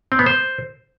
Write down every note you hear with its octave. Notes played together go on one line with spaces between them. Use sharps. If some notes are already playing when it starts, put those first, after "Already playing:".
C4
B3
C5